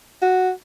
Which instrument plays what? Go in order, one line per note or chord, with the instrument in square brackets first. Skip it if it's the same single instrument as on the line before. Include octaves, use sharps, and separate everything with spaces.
[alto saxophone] F#4